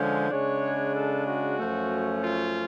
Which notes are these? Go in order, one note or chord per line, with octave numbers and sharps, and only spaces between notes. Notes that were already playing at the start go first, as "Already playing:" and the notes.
Already playing: D3 F3 G#3 C#4
C#3 G#3 D4 C#5
A4
F#4
F#2 F3 A3 C#4
F4